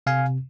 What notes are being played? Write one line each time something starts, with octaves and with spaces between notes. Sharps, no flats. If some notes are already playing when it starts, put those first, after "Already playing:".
C3 F5 G#5